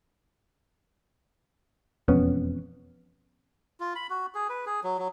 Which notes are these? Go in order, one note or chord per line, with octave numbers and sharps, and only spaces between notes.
E1 F2 B3 C#4
F4
B5
F#4
G#4
B4
G#4
F#3
F#3